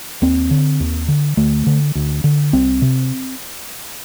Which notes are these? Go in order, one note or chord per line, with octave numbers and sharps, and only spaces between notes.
D#2 C4
D3
D#2
D3
D2 A3
D3
D2
D3
C2 C4
C3